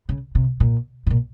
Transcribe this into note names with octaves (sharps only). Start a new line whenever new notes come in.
C#3
C3
A#2
G#2
A#2